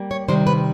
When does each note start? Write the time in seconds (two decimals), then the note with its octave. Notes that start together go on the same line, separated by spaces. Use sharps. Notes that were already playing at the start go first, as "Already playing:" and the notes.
Already playing: G3 A#3
0.11 C#5
0.28 C3 D#3 G3 C5
0.47 B4